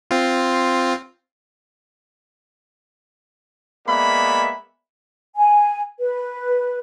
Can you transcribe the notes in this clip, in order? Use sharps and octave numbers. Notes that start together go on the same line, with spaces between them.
C4 F4
G#3 A#3 B3 D5 E5 B5
G#5
B4